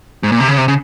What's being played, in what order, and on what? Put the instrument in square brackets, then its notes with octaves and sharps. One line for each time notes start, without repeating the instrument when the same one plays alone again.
[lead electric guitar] G#2
A#2
C3
C#3
C3
C#3